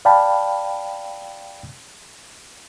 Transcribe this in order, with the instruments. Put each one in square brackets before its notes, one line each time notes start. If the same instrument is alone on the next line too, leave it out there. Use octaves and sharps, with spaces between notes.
[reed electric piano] D5 F5 G5 A5 B5